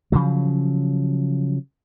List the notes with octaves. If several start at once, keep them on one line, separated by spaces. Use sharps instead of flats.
C#3 F3 F#3